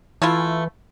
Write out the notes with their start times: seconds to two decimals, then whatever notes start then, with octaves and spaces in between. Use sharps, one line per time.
0.22 E3 A3 E4 F4